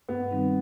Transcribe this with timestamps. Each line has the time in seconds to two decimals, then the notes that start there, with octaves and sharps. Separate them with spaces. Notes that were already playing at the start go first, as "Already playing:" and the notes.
0.09 G2 B3
0.31 D#3 G3 C4 D#4